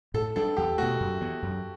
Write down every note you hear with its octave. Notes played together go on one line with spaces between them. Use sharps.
A2 A4
G3 D4 A4
E2 G4
B2 A3 F#4
F#2
E3 B3
F#2